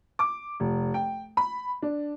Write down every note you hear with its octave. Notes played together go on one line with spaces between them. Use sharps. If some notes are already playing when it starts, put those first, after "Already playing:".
D6
F1
G5
B5
D4